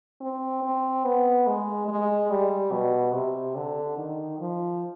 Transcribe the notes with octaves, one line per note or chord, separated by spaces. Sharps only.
C4
C4
B3
G#3
G#3
G3
B2
C3
D3
D#3
F3